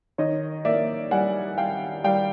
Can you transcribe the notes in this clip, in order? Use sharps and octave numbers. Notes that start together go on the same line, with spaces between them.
D#3 C#5 D#5
A#3 D5 E5
G3 F#5 G#5
G3 F5 G5
G3 F5 G5